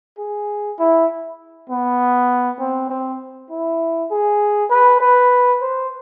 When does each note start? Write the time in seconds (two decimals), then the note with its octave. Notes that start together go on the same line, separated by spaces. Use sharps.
0.18 G#4
0.79 E4
1.70 B3
2.59 C4
2.90 C4
3.50 E4
4.11 G#4
4.70 B4
5.01 B4
5.61 C5